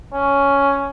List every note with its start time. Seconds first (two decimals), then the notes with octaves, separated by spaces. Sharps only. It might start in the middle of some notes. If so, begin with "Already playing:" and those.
0.13 C#4